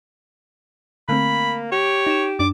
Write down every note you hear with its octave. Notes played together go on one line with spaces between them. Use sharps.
D3 A3 A#3 C4 B5
G4 C#5
D#4 E7
F#2 D4 D6